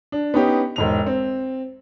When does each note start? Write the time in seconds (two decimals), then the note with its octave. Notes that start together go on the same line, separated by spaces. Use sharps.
0.12 D4
0.34 B3 C#4 D#4 G4
0.76 E1 G#2 F7
1.06 C4